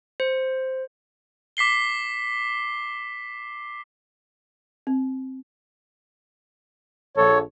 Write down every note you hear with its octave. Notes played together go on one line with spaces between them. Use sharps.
C5
D6 B6 C7 G7
C4
A#1 A4 C#5